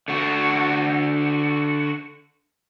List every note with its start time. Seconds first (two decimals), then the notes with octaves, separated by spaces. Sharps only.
0.08 D3 F#4